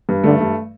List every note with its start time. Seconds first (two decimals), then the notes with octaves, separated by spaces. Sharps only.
0.09 G2
0.24 D3 A3
0.40 G2